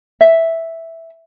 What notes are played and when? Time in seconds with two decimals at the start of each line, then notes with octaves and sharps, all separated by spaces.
0.21 E5